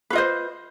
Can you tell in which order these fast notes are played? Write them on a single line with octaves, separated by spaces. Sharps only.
B4 F4 D#5 C5